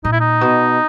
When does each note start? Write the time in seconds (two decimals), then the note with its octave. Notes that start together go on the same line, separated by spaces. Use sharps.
0.04 A#2 D#4
0.12 E4
0.20 D#4
0.41 B2